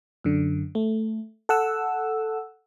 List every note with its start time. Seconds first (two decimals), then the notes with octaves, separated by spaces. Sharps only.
0.24 F#2 D3
0.75 A3
1.49 A4 F#5 E6